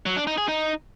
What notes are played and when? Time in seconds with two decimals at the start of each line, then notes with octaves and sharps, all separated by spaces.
0.06 F#3
0.17 D4
0.27 D#4
0.38 G#4
0.48 D#4